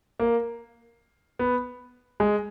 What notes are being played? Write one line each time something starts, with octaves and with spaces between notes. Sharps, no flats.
A#3
B3
G#3